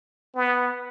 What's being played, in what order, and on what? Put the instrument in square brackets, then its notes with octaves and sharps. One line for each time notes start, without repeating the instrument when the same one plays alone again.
[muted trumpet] B3